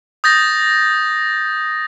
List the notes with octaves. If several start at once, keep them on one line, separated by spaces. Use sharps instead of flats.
D#6 G6 A6 A#6